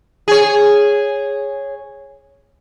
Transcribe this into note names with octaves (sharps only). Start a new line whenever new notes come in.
G#4 C#5